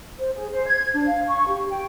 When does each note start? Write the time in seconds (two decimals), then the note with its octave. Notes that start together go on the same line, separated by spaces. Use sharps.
0.19 C5
0.35 G#4
0.52 C5
0.67 G#6
0.93 D4
1.06 F5
1.28 C#6
1.48 G4
1.69 G5